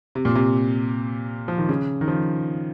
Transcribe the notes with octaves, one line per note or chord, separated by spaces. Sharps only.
C3
A#2
C3
F3
D#3
C#3
D#3
F3